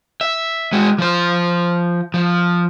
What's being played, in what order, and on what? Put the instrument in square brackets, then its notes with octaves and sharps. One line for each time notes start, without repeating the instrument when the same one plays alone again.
[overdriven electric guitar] E5
G#3 F#4
F3 C5
F3